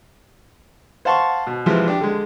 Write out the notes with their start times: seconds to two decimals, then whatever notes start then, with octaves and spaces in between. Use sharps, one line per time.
1.05 C5 F5 F#5 A5 C6 C#6
1.47 B2
1.66 C3 E3 F3 G#3
1.88 D4 G4
2.01 D3 G#3